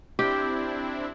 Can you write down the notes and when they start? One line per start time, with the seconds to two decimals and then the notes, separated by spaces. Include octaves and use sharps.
0.19 C4 D4 E4 G4